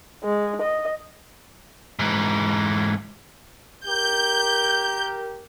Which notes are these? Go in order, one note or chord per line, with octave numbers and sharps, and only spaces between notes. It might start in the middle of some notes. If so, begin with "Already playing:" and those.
G#3
D#5
G#2 E3
G4 A#4 G6